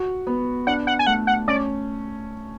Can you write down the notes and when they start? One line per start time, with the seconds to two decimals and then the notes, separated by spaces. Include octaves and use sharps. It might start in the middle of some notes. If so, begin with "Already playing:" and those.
Already playing: F#4
0.27 B3
0.67 D4 F#5
0.87 F#5
0.99 G#5
1.07 A3 F#5
1.27 F#5
1.48 C#4 D5